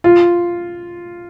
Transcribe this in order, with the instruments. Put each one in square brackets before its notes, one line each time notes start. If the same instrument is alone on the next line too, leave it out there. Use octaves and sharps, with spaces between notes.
[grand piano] F4